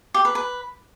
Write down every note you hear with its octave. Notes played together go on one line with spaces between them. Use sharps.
G4
B4
B4